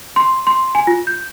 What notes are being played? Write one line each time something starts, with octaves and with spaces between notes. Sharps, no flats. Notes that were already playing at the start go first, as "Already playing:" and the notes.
C6
C6
G#5
F4
G6